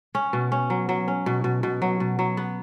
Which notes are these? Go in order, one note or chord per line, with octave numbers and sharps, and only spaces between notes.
C#4
B2
C#4
F#3
F#3
C#4
B2
B2
B2
F#3
B2
F#3
B3